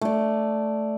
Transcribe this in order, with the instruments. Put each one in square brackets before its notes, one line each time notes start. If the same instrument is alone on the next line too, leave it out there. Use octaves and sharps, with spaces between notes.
[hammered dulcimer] A3 D5